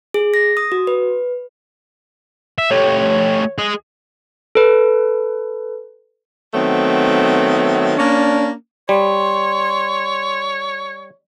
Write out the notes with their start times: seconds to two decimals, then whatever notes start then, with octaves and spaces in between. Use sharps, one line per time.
0.14 G#4
0.34 A#6
0.57 D#6
0.72 F#4
0.87 B4
2.58 E5
2.71 A3 G4 C#5
3.58 G#4 D#5
4.55 A4 B4
6.54 D#3 F#3 A3 B3 C4
7.97 A#3 C#4 D4
8.89 G3 C#5 C6